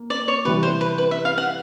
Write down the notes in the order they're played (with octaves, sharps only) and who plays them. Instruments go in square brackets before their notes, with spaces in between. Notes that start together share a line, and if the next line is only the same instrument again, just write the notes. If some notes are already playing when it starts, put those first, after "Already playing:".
Already playing: [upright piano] A#3
[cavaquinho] D5
C#5
[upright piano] C3 E3 G3 [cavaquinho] B4
[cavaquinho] C5
B4
B4
E5
F5
F#5